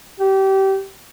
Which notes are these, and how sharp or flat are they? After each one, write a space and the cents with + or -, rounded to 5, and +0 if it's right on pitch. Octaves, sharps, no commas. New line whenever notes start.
G4 -25